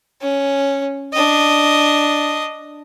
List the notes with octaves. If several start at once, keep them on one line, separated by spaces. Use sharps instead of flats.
C#4
D4 D#5